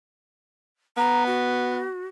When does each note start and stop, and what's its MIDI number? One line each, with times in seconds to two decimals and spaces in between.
0.97 1.85 59
0.97 1.24 82
1.26 2.06 66